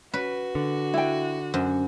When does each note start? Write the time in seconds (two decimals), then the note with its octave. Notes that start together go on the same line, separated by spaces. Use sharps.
0.14 C#4 F#4 B4
0.55 D3
0.94 E4 G5
1.54 F#2 C5